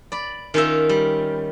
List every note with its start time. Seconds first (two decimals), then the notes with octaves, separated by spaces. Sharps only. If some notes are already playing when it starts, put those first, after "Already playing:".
0.12 D5 B5
0.54 D#3 C#4 D#4 F4 A#4 E5
0.89 G3